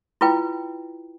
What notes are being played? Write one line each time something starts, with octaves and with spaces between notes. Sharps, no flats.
E4 F4 B4 G5